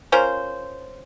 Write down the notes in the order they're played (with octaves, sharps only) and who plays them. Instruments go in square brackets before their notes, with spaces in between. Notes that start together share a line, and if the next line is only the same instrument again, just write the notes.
[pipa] C#4 F4 A#4 C5